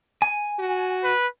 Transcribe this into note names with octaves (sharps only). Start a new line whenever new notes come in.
G#5
F#4
B4